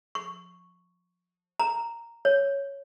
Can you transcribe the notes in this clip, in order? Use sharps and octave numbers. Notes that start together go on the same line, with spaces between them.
C#6
A#5
C#5